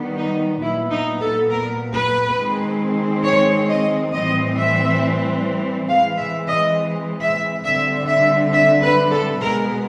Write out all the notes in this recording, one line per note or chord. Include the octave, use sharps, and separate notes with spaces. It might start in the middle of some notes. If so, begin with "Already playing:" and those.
Already playing: D#3 G3 B3
D#4
A#2 F#3 B3 E4
D#4
A4
A#4
B4
D#3 G#3 C4
C#5
D#5
A2 E3 G3 C4 D#5
E5
E3 G#3 C4 F5
E5
D#5
E5
D3 G3 C4 E5
E5
E5
B4
A4
B2 G#3 B3 A#4